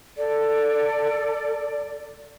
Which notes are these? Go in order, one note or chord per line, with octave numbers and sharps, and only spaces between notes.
A4 D5